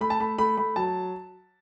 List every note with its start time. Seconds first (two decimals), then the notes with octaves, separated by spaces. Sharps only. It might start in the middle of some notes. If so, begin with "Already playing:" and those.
0.01 A3 B5
0.10 A5
0.20 A3 B5
0.38 A3 B5
0.57 A3 B5
0.76 F#3 A5